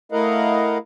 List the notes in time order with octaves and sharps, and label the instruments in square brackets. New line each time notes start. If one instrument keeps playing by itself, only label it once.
[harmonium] A3 E4 A#4 D#5 F5 F#5